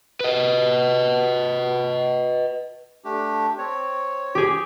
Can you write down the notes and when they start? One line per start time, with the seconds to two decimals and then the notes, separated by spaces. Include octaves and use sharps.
0.20 B4 D#5
3.04 A3 D4 G4
3.58 C4 C#5
4.35 G4 G#4